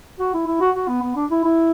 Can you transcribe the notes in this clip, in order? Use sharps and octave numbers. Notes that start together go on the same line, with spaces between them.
F#4
E4
E4
F#4
F#4
B3
B3
D4
E4
E4